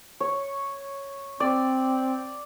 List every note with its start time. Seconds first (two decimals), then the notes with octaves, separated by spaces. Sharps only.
0.20 C#5
1.40 C4 D5